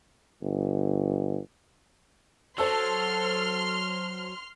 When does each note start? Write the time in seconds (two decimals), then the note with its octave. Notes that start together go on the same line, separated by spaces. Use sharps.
0.42 G1
2.58 F#3 A4 C5 A5 C6 E6 F6